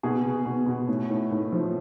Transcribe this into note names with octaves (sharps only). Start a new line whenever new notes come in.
B2 G#4
B2
B2
B2
A2
A2
A2
F3